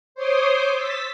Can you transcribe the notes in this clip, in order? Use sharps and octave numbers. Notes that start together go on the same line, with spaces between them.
C5 C#5 C6 D6 D#6
E6 A6 B6